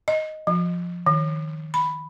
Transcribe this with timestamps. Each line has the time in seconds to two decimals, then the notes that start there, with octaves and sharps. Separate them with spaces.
0.08 D#5
0.47 F3
1.06 D#3
1.74 B5